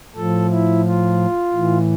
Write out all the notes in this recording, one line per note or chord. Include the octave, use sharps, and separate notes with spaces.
A2 F3 A4
E4
F4
A2 E3